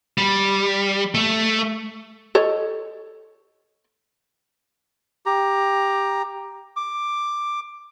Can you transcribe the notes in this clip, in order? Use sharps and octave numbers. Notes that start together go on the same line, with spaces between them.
G3
A3
A4 C#5 D#5
G4 A#5
D6